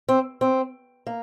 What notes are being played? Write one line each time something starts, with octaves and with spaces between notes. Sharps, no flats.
C4
C4
A#3